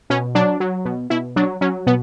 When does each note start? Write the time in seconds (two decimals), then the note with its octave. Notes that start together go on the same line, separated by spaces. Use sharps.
0.10 B2 C#4
0.35 F#3 D4
0.60 F#3
0.85 B2
1.10 B2 E4
1.36 F#3 D4
1.61 F#3 C#4
1.87 B2 B3